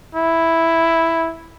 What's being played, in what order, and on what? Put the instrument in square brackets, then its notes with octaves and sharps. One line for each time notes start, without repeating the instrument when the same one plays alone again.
[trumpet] E4